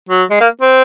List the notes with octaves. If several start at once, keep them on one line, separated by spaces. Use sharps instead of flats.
F#3
G#3
A#3
C4